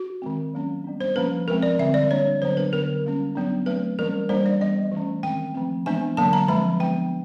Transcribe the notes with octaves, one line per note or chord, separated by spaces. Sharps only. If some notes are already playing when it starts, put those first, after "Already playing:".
Already playing: F#4
D#3 G#3 C4
F#3 A#3 C#4
G3 B3 D4
C5
F3 A#3 C#4 B4
F3 G#3 C4 A#4
D5
D3 G3 C4 E5
D5
G3 A#3 D4 C#5
D3 F#3 B3 D4 C5
B4
D3 F#3 B3 A#4
G3 A#3 C#4
F#3 B3 D4
F#3 A3 C4 B4
E3 G3 A#3 C#4 A#4
G3 A#3 D4 C5
D5
E3 G3 B3 D#5
E3 A3 C#4
D#3 G#3 C4 G5
F3 A3 C4
E3 G#3 B3 D4 G#5
D3 F#3 A#3 A5
A#5
F3 G#3 C4 B5
F3 G#3 B3 D4 G5